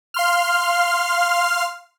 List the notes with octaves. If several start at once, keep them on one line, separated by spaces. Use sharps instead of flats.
F5 C6 F6